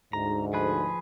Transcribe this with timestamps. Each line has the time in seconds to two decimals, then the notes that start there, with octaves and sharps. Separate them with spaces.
0.13 D2 G#2 A#5
0.53 F3 G#4 B4